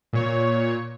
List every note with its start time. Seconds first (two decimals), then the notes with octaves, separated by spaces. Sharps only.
0.13 A#2 C#5